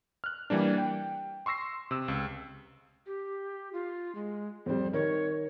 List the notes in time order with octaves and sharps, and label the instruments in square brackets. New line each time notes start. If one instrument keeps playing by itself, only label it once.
[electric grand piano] F6 F#6
E3 G3 A#3 D4
G5
C6 C#6 E6 A#6 C7
C3 E6
C#2
[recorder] G4
F4
G#3
[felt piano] F2 G3 [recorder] C5
[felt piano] D#3 A#4 [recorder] C#5